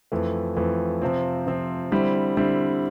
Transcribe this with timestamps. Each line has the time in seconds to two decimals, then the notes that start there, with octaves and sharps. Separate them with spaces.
0.12 F2 E3 A3
0.56 F2 E3 A3
1.02 C3 F3 C4
1.47 C3 F3 C4
1.92 D3 G3 C4 E4
2.37 D3 G3 C4 E4